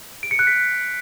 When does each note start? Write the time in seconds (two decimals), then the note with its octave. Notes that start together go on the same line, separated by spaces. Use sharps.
0.23 D7
0.31 C#7
0.39 F#6
0.47 B6